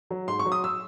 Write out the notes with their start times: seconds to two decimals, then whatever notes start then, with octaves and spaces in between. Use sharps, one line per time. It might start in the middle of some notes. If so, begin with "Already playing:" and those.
0.10 F#3
0.28 G#2 C6
0.39 C#6
0.45 F#3
0.52 D#6
0.64 E6